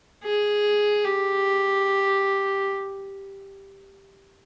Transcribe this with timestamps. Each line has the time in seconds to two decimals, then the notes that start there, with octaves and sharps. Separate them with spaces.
0.24 G#4
1.04 G4